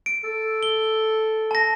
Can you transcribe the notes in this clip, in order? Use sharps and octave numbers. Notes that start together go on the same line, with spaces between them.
D7
A4
G7
A5 A#6